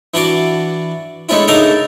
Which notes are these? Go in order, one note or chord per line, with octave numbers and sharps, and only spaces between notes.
E3 D4 F#4 D5
G#3 A3 C#4 D4 E4
C#3 D4 D#4 A4 A#4 A#5